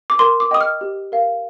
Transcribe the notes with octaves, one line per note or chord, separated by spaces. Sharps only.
D6
A#4 C6
D6
D#5 G5 D#6
F6
G4
A#4 F5